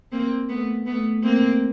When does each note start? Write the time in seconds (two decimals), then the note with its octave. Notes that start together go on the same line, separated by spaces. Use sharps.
0.12 A#3 C4
0.49 A3 B3
0.86 A3 B3
1.23 A#3 C4